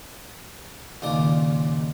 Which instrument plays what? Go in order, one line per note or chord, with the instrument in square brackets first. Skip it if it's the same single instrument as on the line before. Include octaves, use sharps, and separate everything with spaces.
[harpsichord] C#2 A#2 D#3 F4 D5 D#5